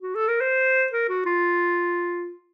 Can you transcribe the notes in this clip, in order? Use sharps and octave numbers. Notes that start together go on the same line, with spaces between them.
F#4
A4
A#4
C5
A#4
F#4
F4